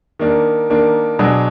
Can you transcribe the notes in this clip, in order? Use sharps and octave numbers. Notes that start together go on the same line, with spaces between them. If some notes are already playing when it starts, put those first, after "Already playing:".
D#3 A#3 D4
D#3 A#3 D4
B2 F#3 D4 G#4